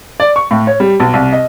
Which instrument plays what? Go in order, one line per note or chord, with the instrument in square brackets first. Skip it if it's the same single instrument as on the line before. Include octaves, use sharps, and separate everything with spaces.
[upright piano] D5
C#6
A2
C#5
G3
B1
C2
D#5